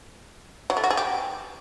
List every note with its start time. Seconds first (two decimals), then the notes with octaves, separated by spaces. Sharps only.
0.70 F#3
0.77 A3
0.84 F#4
0.90 G#4
0.97 G4